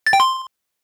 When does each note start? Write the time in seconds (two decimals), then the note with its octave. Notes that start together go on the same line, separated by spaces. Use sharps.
0.07 A6
0.13 G5
0.20 C6